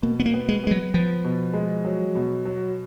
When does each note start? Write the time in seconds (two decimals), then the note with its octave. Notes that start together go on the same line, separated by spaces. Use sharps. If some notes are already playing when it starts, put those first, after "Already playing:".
0.02 B2 A#3
0.20 B3
0.26 A#3
0.34 B3
0.49 G#3
0.64 G#3 B3
0.71 F#3
0.94 F3 B3
1.24 B2
1.53 G#3
1.84 F#3
2.15 B2
2.45 F#3